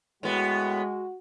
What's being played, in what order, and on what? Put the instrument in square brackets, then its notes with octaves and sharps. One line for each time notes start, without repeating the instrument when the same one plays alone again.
[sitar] A2 B3 [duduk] G#3 [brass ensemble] F#4